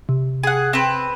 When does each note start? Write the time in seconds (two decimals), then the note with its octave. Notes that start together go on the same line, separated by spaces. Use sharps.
0.09 C3
0.43 G#4 F#5
0.73 C4 B4